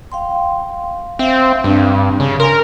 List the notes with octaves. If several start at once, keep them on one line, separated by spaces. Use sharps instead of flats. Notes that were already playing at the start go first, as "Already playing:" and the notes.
F5 G5 C6
C4 E5 F5
G2 C4 D4
C#3
A#4 G#5 C6